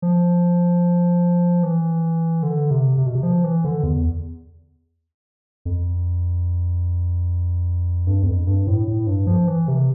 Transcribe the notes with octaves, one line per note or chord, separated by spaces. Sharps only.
F3
E3
D3
C3
C3
B2
C3
F3
E3
D3
E2
F2
G2
E2
F2
G2
A2
A2
G2
F3
E3
C3